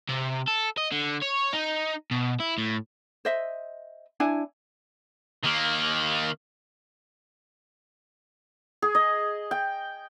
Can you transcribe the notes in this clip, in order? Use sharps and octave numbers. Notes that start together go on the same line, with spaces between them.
C3
A4
D#5
D3
C#5
D#4
B2
E4
A2
C5 D#5 E5
D4 E4 G#5
D#3 A#3
G#4
D#5
G5